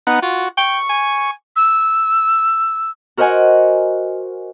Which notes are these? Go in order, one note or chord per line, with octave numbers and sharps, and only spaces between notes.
B3 D#4 F#5
F4 F#4
G5 C#6
G#5
E6
F#4 A#4 C5 D#5 F#5 G#5